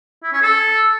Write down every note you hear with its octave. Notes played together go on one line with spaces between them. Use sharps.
E4
C#4
A4